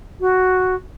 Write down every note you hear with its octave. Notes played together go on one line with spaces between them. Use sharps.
F#4